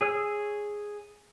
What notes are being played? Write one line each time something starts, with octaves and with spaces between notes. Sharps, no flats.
G#4 C#5 E6